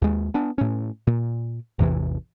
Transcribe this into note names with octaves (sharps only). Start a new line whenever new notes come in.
D#2 G#3
B3 D4
A2 C#4
A#2
A1 E2 C3 E3